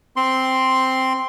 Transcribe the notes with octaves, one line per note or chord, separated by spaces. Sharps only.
C4 C6